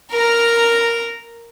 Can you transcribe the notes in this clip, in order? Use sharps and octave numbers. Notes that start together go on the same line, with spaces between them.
A#4 A#5